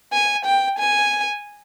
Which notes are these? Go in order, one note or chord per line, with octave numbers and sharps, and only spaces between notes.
G#5
G5
G#5